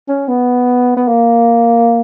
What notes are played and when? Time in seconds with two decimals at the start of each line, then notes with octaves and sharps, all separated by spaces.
0.09 C#4
0.28 B3
0.97 B3
1.08 A#3